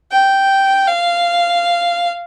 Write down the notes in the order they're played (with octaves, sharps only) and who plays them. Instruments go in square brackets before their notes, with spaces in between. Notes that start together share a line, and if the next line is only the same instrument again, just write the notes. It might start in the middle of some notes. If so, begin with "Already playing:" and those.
[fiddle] G5
F5